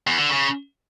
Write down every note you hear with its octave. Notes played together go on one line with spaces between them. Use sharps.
E2
D3
C#3